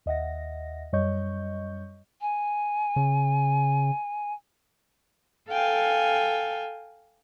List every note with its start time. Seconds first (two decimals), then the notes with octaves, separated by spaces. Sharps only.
0.06 D#2 D#5 E5 F#5 A#6
0.93 F#2 G3 C#5 D#5 C#6 G6
2.21 G#5
2.96 C#3
5.51 A4 F5 G5 G#5